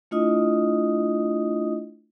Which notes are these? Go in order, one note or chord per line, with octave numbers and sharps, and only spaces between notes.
A3 D4 E4 F4 D#5 D#6